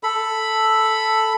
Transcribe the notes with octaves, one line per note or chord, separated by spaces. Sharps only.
A4 B5